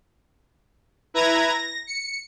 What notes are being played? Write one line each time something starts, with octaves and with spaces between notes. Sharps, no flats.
E4 B4 A#5 G#6 A#6
A#6
C#7